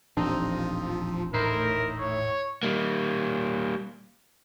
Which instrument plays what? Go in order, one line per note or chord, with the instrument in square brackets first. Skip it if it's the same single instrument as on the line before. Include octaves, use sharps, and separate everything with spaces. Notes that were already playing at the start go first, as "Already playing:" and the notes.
[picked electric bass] D#1 A1 D4 [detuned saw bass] F3 [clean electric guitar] C4 D#4
[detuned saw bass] A2 [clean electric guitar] D#4 E4 C5 [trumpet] A#4
[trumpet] C#5
[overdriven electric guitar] G3 A#3